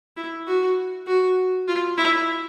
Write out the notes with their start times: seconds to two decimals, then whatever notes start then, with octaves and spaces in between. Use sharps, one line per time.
0.17 E4
0.47 F#4
1.07 F#4
1.68 F4
1.98 E4